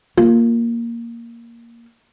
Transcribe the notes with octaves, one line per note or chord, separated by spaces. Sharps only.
A#3 F4